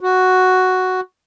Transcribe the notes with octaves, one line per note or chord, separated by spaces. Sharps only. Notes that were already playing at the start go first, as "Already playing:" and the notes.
F#4